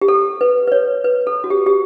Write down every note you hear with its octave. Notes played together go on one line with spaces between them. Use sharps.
G4
A4
B4
B4
C#5
B4
A4
F#4
G4
G4